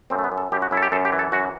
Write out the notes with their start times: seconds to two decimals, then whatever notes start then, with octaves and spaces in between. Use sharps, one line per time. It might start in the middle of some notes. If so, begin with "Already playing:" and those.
0.10 F#2 C4
0.19 A3
0.24 B3
0.32 F#2
0.38 A4
0.52 F#2 G4
0.62 F#4
0.71 F#2 E4
0.77 A4
0.82 G4
0.92 F#2 A4
1.05 G4
1.12 E3
1.19 A4
1.32 F#2 F#4